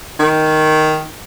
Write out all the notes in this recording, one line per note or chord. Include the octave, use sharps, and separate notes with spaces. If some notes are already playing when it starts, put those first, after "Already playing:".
D#3